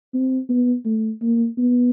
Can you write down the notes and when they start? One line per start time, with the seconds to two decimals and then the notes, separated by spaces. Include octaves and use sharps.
0.14 C4
0.49 B3
0.85 A3
1.22 A#3
1.58 B3